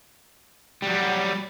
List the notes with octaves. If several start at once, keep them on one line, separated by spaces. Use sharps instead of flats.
F#3 G3